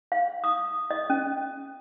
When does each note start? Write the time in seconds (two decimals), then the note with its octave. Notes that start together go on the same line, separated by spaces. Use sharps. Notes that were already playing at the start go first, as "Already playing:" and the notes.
0.12 F5
0.44 D#6
0.91 D#5
1.10 C#4